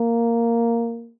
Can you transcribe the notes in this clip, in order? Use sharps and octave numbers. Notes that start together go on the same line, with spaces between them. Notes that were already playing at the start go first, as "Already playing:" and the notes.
Already playing: A#3